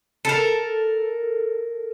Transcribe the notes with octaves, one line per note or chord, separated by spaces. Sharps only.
A4 A#4